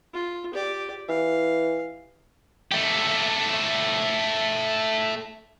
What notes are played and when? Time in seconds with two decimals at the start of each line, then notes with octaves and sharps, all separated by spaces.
0.14 F4
0.53 G4 D5
1.09 E3 F5
2.72 A3 G4